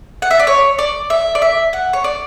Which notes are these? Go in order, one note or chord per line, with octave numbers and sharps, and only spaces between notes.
F#5
E5
D5
C#5
D5
E5
D5
E5
F#5
C#5
D5